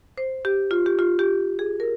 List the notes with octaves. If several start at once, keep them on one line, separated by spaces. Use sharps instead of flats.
C5
G4
F4
G4
F4
G4
G#4
A#4